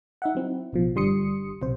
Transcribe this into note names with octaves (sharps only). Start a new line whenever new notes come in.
D#4 E5 F#5
F#3 C4 E4
A1 B2 F3
G1 D3 G3 C6 D#6 C#7
B1 C3 C5